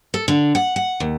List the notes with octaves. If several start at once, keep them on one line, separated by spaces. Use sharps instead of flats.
A4
D3
F#5
F#5
D#2